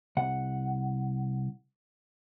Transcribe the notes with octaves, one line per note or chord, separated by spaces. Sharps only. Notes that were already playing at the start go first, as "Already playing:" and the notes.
C2 F#5